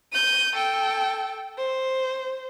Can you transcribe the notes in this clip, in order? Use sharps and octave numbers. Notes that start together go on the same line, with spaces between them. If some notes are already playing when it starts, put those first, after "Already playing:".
G6 D#7
A4 G5
C5